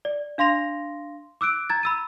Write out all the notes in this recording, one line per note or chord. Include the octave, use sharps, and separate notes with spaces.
D5
D4 F5 C6 A#6 F7
D6 E6 F#6 D7
A#5 G#6 A6
B5 E6 D#7